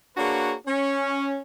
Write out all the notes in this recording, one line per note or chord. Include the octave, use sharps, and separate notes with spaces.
A#3 D4 F#4 G#4 B4 C#5
C#4